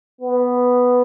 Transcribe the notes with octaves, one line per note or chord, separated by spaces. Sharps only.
B3